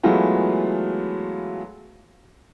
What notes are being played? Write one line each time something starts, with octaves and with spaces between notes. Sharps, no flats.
E3 F#3 G#3 A3 B3 F4